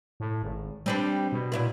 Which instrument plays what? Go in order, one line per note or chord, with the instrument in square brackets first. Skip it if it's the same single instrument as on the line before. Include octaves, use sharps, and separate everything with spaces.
[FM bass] A2
G#1
[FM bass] G3 [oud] C4 D4 B4
[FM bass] B2
[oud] A#2 E4 B4